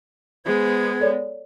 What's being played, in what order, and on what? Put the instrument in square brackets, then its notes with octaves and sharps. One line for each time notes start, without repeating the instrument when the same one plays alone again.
[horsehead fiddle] G#3 B3 [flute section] G#4 C5 G#6
[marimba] A4 C#5 D5